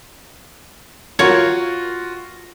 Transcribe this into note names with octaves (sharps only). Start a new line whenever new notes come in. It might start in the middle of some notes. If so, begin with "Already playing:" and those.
F4 F#4 A#4 C#5